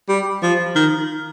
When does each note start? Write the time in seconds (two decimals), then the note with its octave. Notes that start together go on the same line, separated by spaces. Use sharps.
0.09 G3
0.43 F3
0.76 D#3